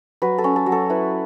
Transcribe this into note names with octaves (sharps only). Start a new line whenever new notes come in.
F#3 B4
A4
C#4
A4
F#3
A4
E4 B4